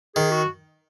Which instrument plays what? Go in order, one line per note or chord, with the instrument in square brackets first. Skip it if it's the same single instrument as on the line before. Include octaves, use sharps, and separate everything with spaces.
[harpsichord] D#3 [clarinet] G#4
[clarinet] F#4